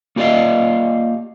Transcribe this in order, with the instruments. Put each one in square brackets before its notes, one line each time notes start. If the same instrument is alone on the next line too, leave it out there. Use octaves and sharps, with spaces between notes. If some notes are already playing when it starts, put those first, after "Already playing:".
[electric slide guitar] A#3 F4 G4 D5 D#5 F5